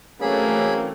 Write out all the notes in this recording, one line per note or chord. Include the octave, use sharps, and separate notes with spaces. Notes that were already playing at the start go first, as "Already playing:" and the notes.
E3 F#3 A3 A#3 C4 C#4 G#4 B5